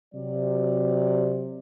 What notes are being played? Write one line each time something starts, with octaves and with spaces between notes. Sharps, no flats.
C3 F#3 D5